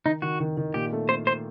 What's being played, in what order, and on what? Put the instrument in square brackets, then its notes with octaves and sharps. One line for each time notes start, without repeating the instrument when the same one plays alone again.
[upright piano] D#3 [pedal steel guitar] D#4
[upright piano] D#3 [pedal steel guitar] F#4
[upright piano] D#3
D#3
[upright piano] A#2 [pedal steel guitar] G4
[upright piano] A3
[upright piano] A3 [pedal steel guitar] C5
[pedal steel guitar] C5